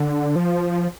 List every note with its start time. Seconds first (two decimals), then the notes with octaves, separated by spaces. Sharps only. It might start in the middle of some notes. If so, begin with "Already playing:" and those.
Already playing: D3
0.36 F3